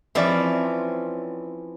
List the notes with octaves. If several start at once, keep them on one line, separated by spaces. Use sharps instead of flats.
E3 F3 C4 C#4 D5 E5